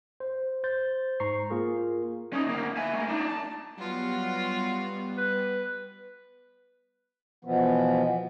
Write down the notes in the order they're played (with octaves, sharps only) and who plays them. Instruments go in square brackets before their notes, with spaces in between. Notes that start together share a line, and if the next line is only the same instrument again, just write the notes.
[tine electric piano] C5
C5 G6 A6
G#2 C5 A#5 C#6 C7
A#3 F4 G#4 A#4
[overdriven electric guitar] C#4 D#4
D2 A#3
E5 G#5
A3 A#3
D4 D#4
A5
[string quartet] F#3 F4 F#4 [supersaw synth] G3 B3
[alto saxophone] B4
[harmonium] B2 E3 F3 B3